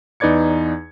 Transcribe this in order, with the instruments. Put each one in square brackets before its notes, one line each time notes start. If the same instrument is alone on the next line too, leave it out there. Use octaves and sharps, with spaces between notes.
[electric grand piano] E2 D#4 B4 D5 G#6 C#7